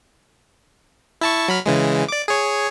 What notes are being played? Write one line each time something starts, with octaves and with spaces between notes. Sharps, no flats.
E4 A5 C#6
F#3 B5 F6
C#3 E3 G#3
D5 D6
G#4 C#5